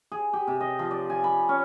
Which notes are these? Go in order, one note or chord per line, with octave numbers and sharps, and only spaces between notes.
G#4
G4
C3
D#5
F3
D5
G#5
B5
C#4